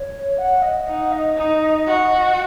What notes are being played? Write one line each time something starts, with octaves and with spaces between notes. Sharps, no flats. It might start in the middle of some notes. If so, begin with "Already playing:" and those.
Already playing: C#5
F#5
D#5
D#4 F#5
D#5
D#4
F#4